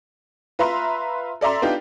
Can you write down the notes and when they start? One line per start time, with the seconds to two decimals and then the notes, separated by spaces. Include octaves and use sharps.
0.59 F4 B4 E5 A#5 C6
1.41 A4 D5 E5 A#5 C6
1.62 B3 D4 D#4 F4 G4